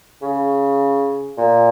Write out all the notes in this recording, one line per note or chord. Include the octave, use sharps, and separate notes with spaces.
C#3
A#2